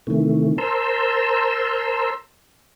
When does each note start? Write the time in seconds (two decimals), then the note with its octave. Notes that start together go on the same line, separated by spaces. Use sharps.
0.07 C3 D#3 E3 A3
0.58 A#4 C5 A5 A#5 C6 E6